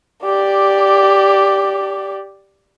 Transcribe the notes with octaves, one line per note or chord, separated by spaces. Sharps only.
G4 D5